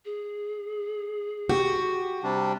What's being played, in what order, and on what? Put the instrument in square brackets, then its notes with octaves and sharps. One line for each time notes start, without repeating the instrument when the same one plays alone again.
[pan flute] G#4
[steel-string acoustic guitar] F#4 [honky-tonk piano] G4
[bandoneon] C3 G3 D4